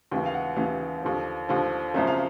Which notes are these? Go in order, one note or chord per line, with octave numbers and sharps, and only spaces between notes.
D#2 C#3 E3 G5
F5
F#5
D#2 C#3 E3 F5
D#2 D3 F3
D#2 D3 F3
G#1 F#2 C#3 F3 E5
F5